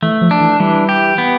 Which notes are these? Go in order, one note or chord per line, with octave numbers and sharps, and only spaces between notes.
E3 A3
F3
D4
E3
E3 G3
G4
B3